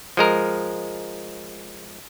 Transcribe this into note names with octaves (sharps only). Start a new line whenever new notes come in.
F3 G#3 A#4